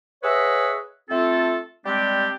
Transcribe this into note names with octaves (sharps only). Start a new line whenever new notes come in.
G#4 B4 C#5 D#5 E5 F#5
A3 C4 F4 A4
G3 G#3 C4 D4 G4